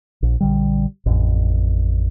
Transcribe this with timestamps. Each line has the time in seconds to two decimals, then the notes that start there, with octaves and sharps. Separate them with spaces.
0.23 A#1
0.41 A#1 D3 G3
1.06 A1 F2